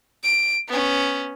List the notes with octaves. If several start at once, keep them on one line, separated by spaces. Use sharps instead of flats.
D7
B3 C#4